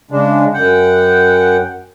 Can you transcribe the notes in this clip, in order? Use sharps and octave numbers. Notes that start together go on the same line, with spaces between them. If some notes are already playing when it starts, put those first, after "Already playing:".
C#3 G#3 D4
F#2 F#5 G5